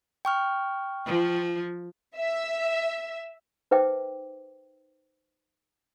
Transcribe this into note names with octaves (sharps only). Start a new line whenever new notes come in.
G5 C#6 F6
F3
E5
D#4 B4 C5 E5 G5 D6